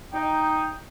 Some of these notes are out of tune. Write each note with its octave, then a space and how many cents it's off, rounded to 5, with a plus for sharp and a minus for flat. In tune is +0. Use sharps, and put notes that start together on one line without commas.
D#4 +0 G5 +0